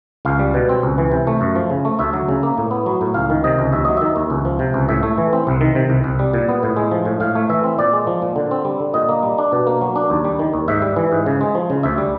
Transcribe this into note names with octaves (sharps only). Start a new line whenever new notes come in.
C#2 F5
G3
B2
C4
C#2
E3
C3
A3
F#2
F3
C#3
A3
D2 E5
F#3
C#3
A#3
A2
B3
F#3
A2
C#2 F5
D#3
C3 D#5
C#2
D#2 E5
F#3 D#5
D#3 E5
D#2
C#2
F3
C3
C#2
A2 E5
A3
E3
C4
C2
D#3
C3
C2
C2
G3
A#2
B3
A2
G#3
F3
A2
A2 F5
A3
E3 E5
C4
A#2 D5
G#3
F3
A#2
D3
C4
G3
D3
A#2 D#5
A#3
G3
D4
B2
A#3
F#3
D4
D#2
G3
D#3
D#2
G#2 E5
G3
E3
G#2
C#3
G#3
F3
C#3
D2 E5
G3